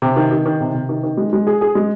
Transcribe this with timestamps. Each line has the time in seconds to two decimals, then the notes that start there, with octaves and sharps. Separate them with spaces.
0.02 C3
0.16 D#3
0.31 D#3
0.46 D#3
0.60 C3
0.74 C3
0.89 D#3
1.03 D#3
1.17 G#3
1.33 G#3
1.47 G#4
1.61 G#4
1.75 G#3